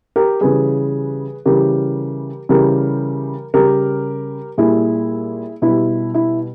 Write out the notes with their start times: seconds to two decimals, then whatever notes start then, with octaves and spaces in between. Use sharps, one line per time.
0.16 G4 A#4
0.41 C#3 E3 G3 G#4 B4
1.45 C#3 E3 G3 G4 A#4
2.49 C#3 E3 G3 G4 A#4
3.54 C#3 G3 G4 A#4
4.58 A#2 G3 E4 G#4
5.62 B2 G3 E4
6.14 E4